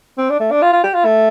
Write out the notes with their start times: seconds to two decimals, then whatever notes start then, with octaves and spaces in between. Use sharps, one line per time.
0.18 C4
0.30 D4
0.40 A3
0.51 D4
0.62 F4
0.73 F4
0.84 G4
0.94 F4
1.05 A3